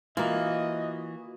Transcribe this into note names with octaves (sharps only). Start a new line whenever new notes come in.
E3 A#3 F4 F#4 D#5